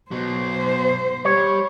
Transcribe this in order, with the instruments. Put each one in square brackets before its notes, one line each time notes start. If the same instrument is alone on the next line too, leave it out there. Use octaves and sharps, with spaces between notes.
[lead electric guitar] B2 F#3 [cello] C5
[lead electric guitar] G3 [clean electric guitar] C#5